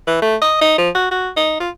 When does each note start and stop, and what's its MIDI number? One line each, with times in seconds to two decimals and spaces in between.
0.07 0.21 52
0.22 0.36 57
0.42 0.57 75
0.61 0.78 63
0.78 0.89 53
0.95 1.11 66
1.11 1.30 66
1.37 1.56 63
1.60 1.70 65